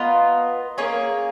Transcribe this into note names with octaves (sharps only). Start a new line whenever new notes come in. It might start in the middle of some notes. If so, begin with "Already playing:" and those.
Already playing: B3 F4 A#4 D#5
A#3 C#4 G#4 C#5